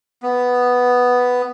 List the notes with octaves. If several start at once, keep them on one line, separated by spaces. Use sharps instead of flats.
B3